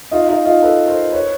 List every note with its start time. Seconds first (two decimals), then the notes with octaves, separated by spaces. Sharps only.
0.11 D#4 F4
0.28 D#4 F4
0.45 D#4 F4
0.62 A4 B4
0.87 A#4 C5
1.12 B4 C#5